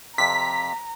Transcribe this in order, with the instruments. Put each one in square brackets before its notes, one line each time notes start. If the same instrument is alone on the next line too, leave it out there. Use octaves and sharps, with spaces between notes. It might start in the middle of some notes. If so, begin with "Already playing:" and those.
[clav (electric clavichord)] F2 C3 [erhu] A#5 [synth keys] B6